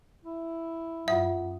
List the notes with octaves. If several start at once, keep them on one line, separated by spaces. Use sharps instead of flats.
E4
F#2 F4 E5 F#5 D#6